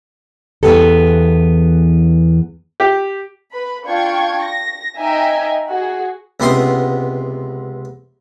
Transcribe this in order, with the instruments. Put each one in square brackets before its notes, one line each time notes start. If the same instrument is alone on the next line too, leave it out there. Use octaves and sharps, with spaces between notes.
[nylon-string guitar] E2 D#3 E3 B3 G4 A4
[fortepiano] G4
[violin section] B4 B5
D4 F4 G5 C#6 G#6
A#6
D#4 D#5 E5 G5 G#5 A#5
F#4 G#4
[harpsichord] C#2 C3 B3 C6 C#6 D#6